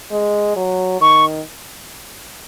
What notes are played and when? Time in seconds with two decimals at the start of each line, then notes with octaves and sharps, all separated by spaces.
0.11 G#3
0.56 F#3
1.00 D#3 C#6